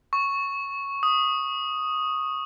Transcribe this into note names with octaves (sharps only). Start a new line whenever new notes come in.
C#6
D#6